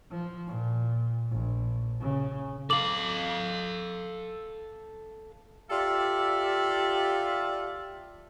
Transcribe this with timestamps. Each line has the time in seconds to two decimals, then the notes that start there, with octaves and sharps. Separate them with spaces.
0.10 F3
0.47 A#2
1.30 A#1
2.00 C#3
2.70 A4 F5 D6 F#7
5.71 F4 G4 A4 D5 E5